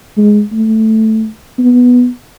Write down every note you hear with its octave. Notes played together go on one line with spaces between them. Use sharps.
G#3
A3
B3